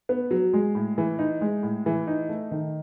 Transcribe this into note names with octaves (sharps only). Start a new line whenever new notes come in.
B3
F#3
G#3
A2
E3
D#4
G#3
A2
E3
D#4
A3
D#3